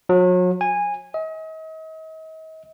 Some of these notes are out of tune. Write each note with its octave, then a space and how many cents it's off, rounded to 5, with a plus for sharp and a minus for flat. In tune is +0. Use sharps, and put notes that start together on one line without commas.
F#3 -35
G#5 -15
D#5 +40